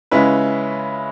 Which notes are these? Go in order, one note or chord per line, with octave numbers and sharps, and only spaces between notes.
C#3 G#3 C#4 E4 B4